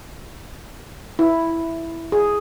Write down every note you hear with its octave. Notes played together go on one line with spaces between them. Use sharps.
E4
G#4